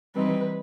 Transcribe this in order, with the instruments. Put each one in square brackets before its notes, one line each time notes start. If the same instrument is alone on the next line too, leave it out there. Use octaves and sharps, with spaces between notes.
[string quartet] E3 G3 C4 D#4 B4